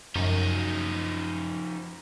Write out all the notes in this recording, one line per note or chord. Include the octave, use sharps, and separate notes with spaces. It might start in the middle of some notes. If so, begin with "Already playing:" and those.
F#2 F3 D#4